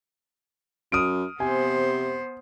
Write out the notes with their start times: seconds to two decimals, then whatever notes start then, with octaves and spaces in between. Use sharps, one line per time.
0.92 F#2 D#6 F6 D7
1.40 C3 B3 C5 G#5